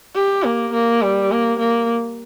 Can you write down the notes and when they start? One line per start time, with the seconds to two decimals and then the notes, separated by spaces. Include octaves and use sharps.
0.15 G4
0.45 A#3
0.73 A#3
1.02 G3
1.31 A#3
1.59 A#3